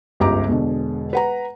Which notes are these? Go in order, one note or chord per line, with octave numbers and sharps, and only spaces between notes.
G1 C#2 G4 A#5 D6
E1 B2 D3
B4 F#5 A#5